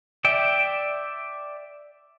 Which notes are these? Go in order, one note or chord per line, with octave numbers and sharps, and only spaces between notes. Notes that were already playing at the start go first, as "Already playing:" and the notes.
D5 E5 G5